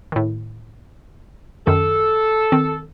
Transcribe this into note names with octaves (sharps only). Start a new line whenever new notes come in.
A2 D#3
F#2 D#3 A4
D#3 C4